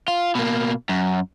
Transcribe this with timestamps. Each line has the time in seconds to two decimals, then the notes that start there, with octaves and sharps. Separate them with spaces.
0.08 F4
0.35 B2 A#3
0.89 F#2